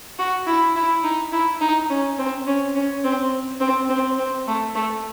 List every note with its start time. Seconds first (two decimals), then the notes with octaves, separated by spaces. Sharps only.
0.19 F#4
0.47 E4
0.76 E4
1.04 D#4
1.32 E4
1.61 D#4
1.90 C#4
2.18 C4
2.47 C#4
2.75 C#4
3.04 C4
3.60 C4
3.89 C4
4.18 C4
4.47 A3
4.75 A3